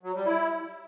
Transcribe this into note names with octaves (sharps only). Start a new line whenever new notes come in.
F#3
G3
E4